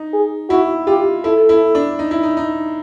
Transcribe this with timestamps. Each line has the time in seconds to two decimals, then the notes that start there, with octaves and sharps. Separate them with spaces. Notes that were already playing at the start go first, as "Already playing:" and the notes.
Already playing: D#4
0.13 G#4
0.49 E4 F#4
0.87 F4 G4
1.24 E4 A4
1.49 E4
1.75 D4
1.99 D#4
2.11 E4
2.23 D#4
2.37 D#4